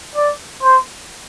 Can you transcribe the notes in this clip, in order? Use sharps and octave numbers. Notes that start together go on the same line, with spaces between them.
D5
C5